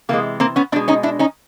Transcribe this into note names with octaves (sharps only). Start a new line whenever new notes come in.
C3 E3 G#3 A#3
A#3 C4
B3 C#4
B2 G#3 C4 D4
C#4 D#4
D4 E4
C#4 D#4